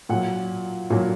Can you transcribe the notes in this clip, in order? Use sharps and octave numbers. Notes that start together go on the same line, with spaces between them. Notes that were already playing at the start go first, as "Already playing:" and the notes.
A#2 F#3 F#5
A#2 F#3